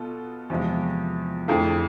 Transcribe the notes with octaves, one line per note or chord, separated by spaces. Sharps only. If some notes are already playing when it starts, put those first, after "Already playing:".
Already playing: B2 B3 F4 A4
E2 C3 F3 G#3
F2 D3 A3 E4 G#4